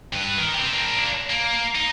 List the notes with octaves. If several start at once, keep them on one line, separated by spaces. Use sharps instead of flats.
G2 B4
D#3
C4 G4
A#3 D4
A#3
D#4